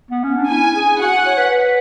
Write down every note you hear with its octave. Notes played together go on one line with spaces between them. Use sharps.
B3
C#4
D4
E4 G#5
G#4
F#4 F#5
C#5
B4
B4